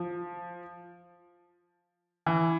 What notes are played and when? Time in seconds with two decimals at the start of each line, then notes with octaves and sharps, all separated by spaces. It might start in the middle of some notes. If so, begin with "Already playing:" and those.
Already playing: F3
2.26 E3